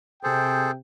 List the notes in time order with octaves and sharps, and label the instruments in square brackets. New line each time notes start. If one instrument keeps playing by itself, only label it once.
[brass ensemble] C3 G5 [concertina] G#4 A4 C5